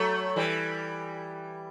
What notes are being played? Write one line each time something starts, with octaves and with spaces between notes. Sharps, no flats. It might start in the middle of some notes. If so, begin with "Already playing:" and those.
Already playing: F#3 A3
E3 G3